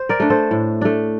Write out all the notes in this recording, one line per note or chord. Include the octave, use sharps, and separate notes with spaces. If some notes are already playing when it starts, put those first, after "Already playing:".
Already playing: C5
A#4 D5
A3 D4
A4 C5
A2
A3 D4